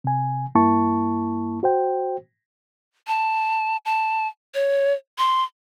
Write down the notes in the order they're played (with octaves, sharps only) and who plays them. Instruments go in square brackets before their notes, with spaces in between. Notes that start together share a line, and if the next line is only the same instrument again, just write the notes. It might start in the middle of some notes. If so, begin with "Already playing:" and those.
[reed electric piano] C3 G#5
G2 A#3 E4 A5 C#6
F#4 C5 G5
[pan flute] A5
A5
C#5
C6